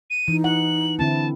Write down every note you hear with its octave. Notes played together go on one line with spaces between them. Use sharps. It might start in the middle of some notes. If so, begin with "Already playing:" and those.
D#7
E3 D#4
F#5 F#7
D3 C4 E4 A5